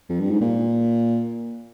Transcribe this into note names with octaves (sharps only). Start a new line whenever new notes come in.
F2
G2
G#2
A#2